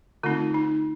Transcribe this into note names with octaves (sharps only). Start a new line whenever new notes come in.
D3 A3 C4 D#4 F4
D#4